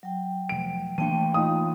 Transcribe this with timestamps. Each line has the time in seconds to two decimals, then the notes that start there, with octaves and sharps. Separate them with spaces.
0.03 F#3 G5
0.49 F1 D7
0.98 E3 A3 A#3 D4 G5 A5 D#7
1.34 D#4 F4 D#6